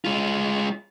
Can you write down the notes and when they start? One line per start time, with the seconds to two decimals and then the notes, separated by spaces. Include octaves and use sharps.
0.05 G#3 F4